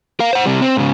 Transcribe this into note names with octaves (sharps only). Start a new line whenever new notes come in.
A#4 F5
C5 F#5
C3 G3
C4
G#2 C#3